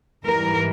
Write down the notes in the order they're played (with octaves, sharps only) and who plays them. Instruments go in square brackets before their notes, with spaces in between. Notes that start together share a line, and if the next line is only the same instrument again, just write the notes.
[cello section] G#2 E3 G3 A#4